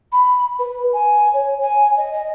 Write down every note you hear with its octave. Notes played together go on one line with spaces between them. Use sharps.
B5
B4
G#5
C#5
G#5
D#5
D#5